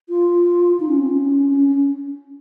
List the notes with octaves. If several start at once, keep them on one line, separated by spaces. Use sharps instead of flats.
F4
D#4
C#4
C4
C#4
C#4
C#4